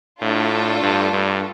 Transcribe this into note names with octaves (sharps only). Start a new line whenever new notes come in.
A2 A3 D4 F4 A4
G2
G2